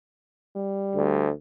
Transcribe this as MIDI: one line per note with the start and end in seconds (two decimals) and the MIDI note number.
0.56 1.28 55
0.95 1.30 38